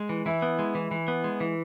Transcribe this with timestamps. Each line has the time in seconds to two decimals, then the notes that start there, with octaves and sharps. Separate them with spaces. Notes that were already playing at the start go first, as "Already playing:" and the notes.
Already playing: G#3
0.09 E3
0.26 E3 E4
0.42 B3
0.59 G#3
0.75 E3
0.91 E3
1.08 B3
1.24 G#3
1.40 E3